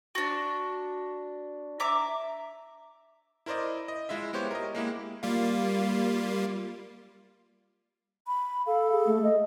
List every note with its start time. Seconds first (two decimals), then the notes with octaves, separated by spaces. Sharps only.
0.15 D4 F#4
1.80 E5 A#5 D6
3.46 E4 A#4 C5 D5 D#5
3.88 D#5
4.09 G#3 E4 F4 E5
4.33 G#3 B3 G4 C5 C#5
4.51 A#4 D#5
4.75 G#3 A#3 E4 G4
5.23 G3 A#3 F4
8.27 B5
8.66 A4 F5
8.92 G#4
9.07 A3
9.23 D#5